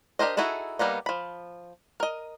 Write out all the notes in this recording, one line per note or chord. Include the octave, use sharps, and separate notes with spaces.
D4 G4 A#4 C5 D#5
D#4 E4 F#4 G#4 A4
G3 A#3 B3 D#4
F3 B5
A#4 D#5